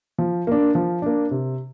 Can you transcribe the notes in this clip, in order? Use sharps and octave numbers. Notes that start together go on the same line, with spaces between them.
F3
A#3 D4
F3
A#3 D4
C3